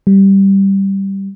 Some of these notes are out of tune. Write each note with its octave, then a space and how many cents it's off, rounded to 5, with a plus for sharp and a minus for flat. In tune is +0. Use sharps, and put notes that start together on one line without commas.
G3 -5